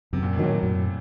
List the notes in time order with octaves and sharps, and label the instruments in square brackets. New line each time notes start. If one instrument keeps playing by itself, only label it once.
[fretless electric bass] F#2 [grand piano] C3
[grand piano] A#2
A2
[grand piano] A#2 [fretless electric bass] D#3 F#3
[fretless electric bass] F#2